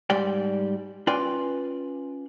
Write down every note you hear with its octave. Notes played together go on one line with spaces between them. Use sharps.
G#2 G3 D5 G5
C#4 F4 B4 D5 G5 C6